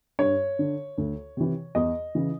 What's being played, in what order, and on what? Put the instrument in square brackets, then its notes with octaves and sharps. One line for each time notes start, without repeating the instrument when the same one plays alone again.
[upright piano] G2 C#5
D3
D2
C3 E3
E2 D#5
C#3 E3